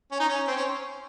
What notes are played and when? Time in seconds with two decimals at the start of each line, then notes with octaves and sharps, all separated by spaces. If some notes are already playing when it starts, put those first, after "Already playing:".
0.12 C#4
0.20 D#4
0.28 C#4
0.47 C4
0.56 C#4